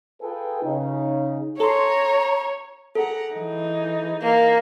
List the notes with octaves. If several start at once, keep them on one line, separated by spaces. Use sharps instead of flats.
F4 G#4 A4 B4 G5 G#5
C#3 D#4
A4 C#5 A#5 C6
G#4 A4 F#5 A#5
E3 D#4
A#3